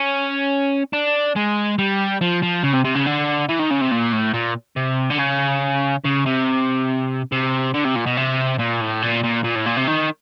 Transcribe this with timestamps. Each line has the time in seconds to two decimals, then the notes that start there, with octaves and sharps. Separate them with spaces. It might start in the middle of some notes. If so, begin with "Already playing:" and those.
Already playing: C#4
0.93 D4
1.36 G#3
1.78 G3
2.21 F3
2.43 F3
2.64 C#3
2.74 C3
2.85 C3
2.95 C#3
3.06 D3
3.49 E3
3.59 D#3
3.70 C#3
3.81 C3
3.91 A#2
4.12 A2
4.34 A#2
4.76 C3
5.11 D3
5.19 C#3
6.04 C#3
6.26 C3
7.32 C3
7.74 D3
7.85 C3
7.96 A#2
8.06 B2
8.17 C3
8.59 A#2
8.81 A2
9.02 A#2
9.24 A#2
9.44 A#2
9.56 A2
9.66 A#2
9.77 C3
9.87 D#3